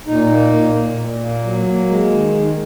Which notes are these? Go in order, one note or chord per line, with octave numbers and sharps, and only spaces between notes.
A#2 D#4
A#3
A#2
A#2
A#2
A#3
F#3
A#3
G#3
D#3
D#3